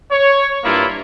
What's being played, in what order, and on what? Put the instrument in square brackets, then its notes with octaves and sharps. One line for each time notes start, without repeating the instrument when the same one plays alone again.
[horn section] C#5
G2 A#3 E4 F4